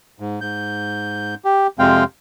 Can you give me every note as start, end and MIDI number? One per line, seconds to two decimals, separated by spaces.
0.20 0.40 44
0.41 1.35 44
0.41 1.35 91
1.45 1.67 67
1.79 2.04 41
1.79 2.04 48
1.79 2.04 56
1.79 2.04 60
1.79 2.04 77
1.79 2.04 79